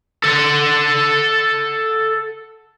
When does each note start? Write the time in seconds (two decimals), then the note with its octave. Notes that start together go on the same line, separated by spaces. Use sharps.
0.24 A4 F#5